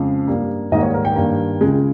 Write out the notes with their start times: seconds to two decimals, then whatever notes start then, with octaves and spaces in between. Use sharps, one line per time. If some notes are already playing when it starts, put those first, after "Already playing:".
Already playing: F2 C#3 F3 G#3 F5
0.28 G2 G3 A#3
0.72 G#2 D#3 G3 A#3 D#5
0.82 C#5
0.94 A#4
1.05 G5
1.16 G2 D#3 G3 A#3
1.61 C#2 C#3 G#3